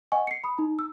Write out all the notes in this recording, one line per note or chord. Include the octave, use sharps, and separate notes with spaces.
D#5 F#5 G#5 C#6
C7 C#7
B5 D#6
D#4 A#5
E6